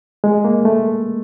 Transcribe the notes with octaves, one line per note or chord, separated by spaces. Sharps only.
G#3
A#3
A3